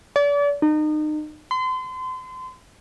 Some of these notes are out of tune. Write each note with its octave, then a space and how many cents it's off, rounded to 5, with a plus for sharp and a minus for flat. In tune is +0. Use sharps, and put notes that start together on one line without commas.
D5 -35
D#4 -30
C6 -35